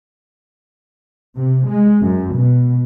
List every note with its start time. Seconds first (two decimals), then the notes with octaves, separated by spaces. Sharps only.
1.37 C3
1.68 G#3
2.04 F#2
2.34 B2